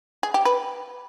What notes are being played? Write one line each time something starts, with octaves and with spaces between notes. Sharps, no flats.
G#4
G4
B4